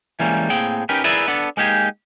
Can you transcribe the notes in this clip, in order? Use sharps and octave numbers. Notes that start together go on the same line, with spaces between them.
E3 G3 G#3 A#3 C#4
A2 A#3 C4 G#4 G5
C#4 D#4 G4 A#4 B4
E4 G#4 A#4 B4 D5 E5
B3 D4 A4
G#3 A#3 D#4 G4 G#4